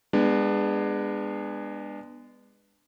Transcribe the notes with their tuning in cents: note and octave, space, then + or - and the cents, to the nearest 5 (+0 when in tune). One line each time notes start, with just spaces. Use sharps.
G#3 -20 B3 +0 D4 +20